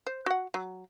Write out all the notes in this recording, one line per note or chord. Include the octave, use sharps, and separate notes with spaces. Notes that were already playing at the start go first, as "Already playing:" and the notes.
C5
F#4 F#5
F#3